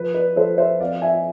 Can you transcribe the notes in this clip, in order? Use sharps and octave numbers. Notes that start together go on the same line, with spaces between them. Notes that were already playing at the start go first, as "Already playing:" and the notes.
Already playing: F3 B4
B4 D5
F3 A4 C5
C5 E5
F2 D5 F5
E5 G#5